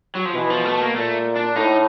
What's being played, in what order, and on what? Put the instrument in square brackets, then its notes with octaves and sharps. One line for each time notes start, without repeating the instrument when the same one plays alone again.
[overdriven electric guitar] F#3
F3
[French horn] B2 [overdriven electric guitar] E3
[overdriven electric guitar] F3
A3
A#3
[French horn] A#2 [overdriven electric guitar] A3
[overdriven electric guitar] D4
[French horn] A2 [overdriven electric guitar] D#4